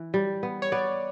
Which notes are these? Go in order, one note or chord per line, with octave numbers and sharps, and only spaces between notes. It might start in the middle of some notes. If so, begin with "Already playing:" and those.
Already playing: E3
G3
B3
C#5
B3 D5